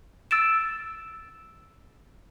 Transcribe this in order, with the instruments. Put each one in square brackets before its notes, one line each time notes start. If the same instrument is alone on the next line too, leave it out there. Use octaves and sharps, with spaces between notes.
[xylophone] E6 A6 D7 E7